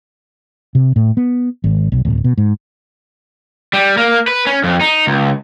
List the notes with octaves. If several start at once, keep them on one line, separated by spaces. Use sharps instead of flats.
C3
A2
B3
G#1
B1
D1
B2
G#2
G3
A#3
B4
C#4
F2
D#4
C#2